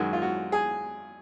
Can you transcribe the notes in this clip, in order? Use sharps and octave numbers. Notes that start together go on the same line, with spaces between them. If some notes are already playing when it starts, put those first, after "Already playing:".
Already playing: F#2 D#3 G#3 F#4
F4
F#4
G#4